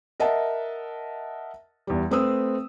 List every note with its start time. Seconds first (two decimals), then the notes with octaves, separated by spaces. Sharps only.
0.20 A#4 D#5 E5 F#5 A5
1.87 E2 G3
2.11 A3 C4 B4 D#6 E6